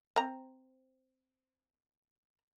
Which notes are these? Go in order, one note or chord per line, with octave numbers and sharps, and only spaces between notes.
C4 A#5